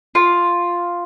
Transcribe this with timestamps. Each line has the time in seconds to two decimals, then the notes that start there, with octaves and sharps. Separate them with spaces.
0.15 F4